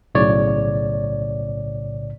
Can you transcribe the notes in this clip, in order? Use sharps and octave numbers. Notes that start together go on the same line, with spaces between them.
B1 A2 C#3 C#5 D5